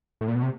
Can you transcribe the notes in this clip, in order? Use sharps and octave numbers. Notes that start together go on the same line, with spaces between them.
A2
A#2
B2
C3